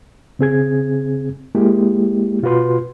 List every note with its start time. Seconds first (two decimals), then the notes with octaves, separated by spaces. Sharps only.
0.39 C#3 C4 G#4 G#6
1.55 G#3 A#3 E4 G4
2.42 B2 F4 F#4 B4 C6